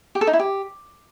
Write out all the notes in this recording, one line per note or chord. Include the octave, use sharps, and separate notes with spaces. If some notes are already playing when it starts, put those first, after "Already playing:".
G4
A4
D#4
E4
G4